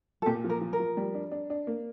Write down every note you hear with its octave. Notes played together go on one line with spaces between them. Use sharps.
A4
A#2 G4
F3
A#4
F3
A#4
F3
G3
D4
D4
D4
A#3